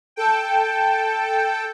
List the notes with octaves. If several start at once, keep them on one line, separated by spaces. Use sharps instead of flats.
A4 G5